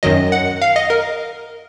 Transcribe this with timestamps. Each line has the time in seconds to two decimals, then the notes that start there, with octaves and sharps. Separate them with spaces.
0.03 F#2 D#3 F#3 D#5
0.32 F#5
0.62 F5
0.76 D#5
0.90 A#4